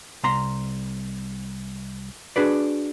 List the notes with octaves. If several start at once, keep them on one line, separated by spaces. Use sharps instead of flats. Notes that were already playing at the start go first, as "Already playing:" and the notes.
C2 F5 A#5 C6
D4 F#4 G#4 B4 D5